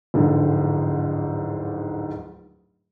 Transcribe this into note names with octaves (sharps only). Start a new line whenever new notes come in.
D1 F2 G#2 D3